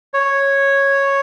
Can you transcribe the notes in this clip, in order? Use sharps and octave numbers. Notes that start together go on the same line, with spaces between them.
C#5